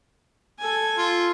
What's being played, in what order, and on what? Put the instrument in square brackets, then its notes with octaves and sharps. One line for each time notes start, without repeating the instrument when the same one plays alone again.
[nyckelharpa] A4 G#5
[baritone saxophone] F4